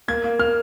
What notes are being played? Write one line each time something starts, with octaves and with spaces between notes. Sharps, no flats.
A#3 G#6
A#3
A#3 F6